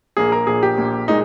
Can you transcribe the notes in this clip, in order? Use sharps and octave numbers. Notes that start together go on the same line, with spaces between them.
A#1 A#2 A#3 G#4
A#4
A#1 A#2 A#3 G#4
G4
A#1 A#2 A#3
A#2 G#3 D#4